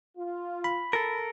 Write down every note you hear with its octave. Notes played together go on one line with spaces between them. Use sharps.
F4
B5
A4 A#4